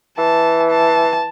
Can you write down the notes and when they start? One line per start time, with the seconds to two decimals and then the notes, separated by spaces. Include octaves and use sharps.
0.18 E3 A5
0.71 A5